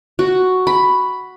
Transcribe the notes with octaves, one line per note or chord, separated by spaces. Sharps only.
F#4
B5